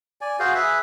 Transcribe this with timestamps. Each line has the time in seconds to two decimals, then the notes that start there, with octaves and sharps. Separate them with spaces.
0.21 D5 G#5
0.39 F#4 G#4 C5 F5
0.55 G#4 B4 E5